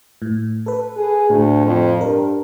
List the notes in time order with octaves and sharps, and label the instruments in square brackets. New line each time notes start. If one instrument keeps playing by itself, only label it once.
[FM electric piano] A2
A4 B4
[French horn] G#4
[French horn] D2 [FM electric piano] A2
[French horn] F2
[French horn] G2 [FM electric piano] A#4